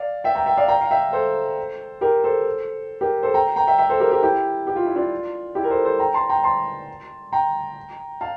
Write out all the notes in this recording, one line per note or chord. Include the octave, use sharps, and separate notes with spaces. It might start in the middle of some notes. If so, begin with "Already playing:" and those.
Already playing: D5 F5
E5 G5
G5 A#5
E5 G5
D5 F5
G5 A#5
F5
E5 G5
A4 C5
G4 A#4
A4 C5
G4 A#4
A4 C5
G5 A#5
G5 A#5
E5 G5
E5 G5
A4 C5
G4 A#4
G4 A#4
E4 G4
G4
F4
E4
D4 F4
E4 G4
A#4
A4 C5
A4 C5
G5 A#5
A5 C6
G5 A#5
A5 C6
G5 A#5
F5 A5